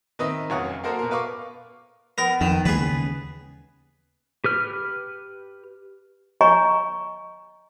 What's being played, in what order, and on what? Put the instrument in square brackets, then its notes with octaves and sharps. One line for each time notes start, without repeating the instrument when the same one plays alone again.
[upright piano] D#3 C4 B4 D#5 E5 D#6
F1 F#2 C#5 F5 F#5 D#6
A#3 F#4 A4 A#4 C5 D#5
B2 A#4
B4 F5 C#6 D6
[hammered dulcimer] B3 [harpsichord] A#4
[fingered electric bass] F2 [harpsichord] D#3
[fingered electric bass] D#2 [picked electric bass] E3 G#3 [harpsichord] G#4 B4
[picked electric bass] C#3
[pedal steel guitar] G4 B4 F6
[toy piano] C#5 D#5 G#5 A#5 C#6